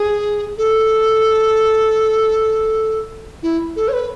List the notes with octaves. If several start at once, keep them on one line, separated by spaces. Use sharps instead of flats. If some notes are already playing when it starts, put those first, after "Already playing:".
Already playing: G#4
A4
E4
A4
C#5
B4